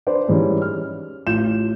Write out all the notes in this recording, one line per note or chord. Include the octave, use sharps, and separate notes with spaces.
D4 B4 C5 D5
G#2 E3 G3 C#4
F6
A1 F4 G6 E7